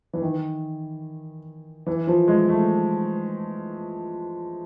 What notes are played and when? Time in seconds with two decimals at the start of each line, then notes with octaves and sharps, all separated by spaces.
0.13 E3
0.22 D#3
1.86 E3
2.07 F3
2.28 G#3
2.48 A3